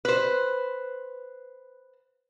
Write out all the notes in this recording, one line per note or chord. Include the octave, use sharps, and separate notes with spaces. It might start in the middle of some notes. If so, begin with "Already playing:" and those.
B4 C5